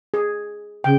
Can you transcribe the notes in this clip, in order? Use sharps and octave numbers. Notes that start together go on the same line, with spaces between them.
G#4
C#3 G5